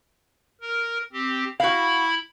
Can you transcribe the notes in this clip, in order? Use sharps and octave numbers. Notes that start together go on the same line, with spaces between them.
A#4
C4 G4
E4 F#4 F5 B5